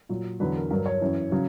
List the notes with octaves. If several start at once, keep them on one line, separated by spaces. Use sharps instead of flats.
A#2 F#3
E2 D3 F#3 B4
A#4
G2 F#3 A#4
C#5
F#2 E3
C#3 F#3